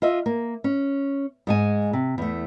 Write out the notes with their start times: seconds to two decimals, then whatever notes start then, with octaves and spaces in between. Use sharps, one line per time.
0.02 F4 D#5 E5
0.26 A#3
0.64 C#4
1.47 G#2 G#3 G#5
1.93 C3
2.18 E2 A3